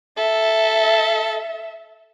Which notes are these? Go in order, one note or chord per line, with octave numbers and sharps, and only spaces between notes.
A4 E5